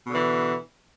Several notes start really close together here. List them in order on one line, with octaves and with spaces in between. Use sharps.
B2 D3 E3